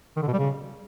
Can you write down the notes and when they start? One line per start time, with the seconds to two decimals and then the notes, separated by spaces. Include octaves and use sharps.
0.17 D#3
0.22 D3
0.28 B2
0.33 G3
0.39 C#3